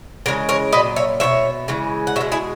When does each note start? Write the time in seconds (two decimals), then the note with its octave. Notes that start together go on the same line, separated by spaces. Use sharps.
0.26 C#3 E3 G#3 A#4 C#5
0.49 A#4 C#5
0.72 A#2 F#3 B4 D#5
0.96 C#5 E5
1.20 B2 G#3 C#5 E5
1.68 C#3 E3 G#3
2.07 F#5
2.16 B2 C#5 E5
2.21 G#3
2.32 E4 G#4